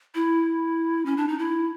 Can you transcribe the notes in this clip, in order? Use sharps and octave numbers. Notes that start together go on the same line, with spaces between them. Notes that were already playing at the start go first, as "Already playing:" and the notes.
E4
C#4
D4
D#4
E4